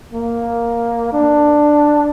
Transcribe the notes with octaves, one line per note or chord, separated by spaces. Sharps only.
A#3
D4